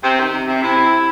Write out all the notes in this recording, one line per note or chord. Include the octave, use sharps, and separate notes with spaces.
C3 C4
D#3
C3
C3
C3 E4
C3